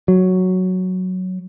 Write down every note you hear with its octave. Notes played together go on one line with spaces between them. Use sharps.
F#3